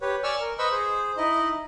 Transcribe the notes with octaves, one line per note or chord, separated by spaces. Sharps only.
G4 B4 C#5
D5 G#5 C#6 E6 F6
A#4
B4 C5 D#5 B5 C#6 E6
G#4 C5
D#4 E4 D#5